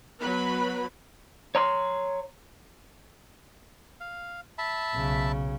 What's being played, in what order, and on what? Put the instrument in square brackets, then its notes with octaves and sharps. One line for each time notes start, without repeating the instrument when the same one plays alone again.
[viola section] F#3 B3 B4 B5
[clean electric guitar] C#5 A#5 C6
[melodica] F5
E5 A5 B5
[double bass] B1 C#3